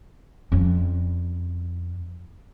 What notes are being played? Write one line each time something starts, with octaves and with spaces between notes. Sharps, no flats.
F2 C#4